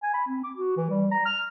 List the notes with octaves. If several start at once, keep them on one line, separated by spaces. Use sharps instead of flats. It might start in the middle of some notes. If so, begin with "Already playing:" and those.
G#5
B5
C4
D6
F#4
E3
G3
A#5
F6